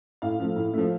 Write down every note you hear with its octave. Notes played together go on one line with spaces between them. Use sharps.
A2 F5
F3 A3
A2
F3 A3